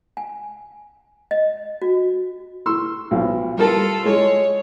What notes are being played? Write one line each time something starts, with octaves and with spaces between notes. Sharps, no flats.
G#5
D#5
F#4
C6 C#6 E6
B1 F3 F5
G3 F4 A4 A#4 A5
G#3 C#5